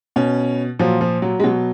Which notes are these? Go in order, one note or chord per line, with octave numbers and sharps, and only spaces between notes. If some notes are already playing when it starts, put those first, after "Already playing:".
B2 C#4
A#2 F3 F#3
F3
F#3
G#3
B2 F#3